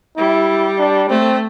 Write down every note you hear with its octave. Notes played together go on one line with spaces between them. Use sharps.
G3 E4
D4
A3 C4